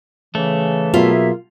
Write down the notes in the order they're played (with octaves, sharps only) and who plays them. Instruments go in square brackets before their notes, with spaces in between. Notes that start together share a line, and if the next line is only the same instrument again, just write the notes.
[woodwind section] C#3 E3 [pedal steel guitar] A3
[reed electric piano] B2 F#3 B3 [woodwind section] A#3 G#4 E5 [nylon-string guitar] F4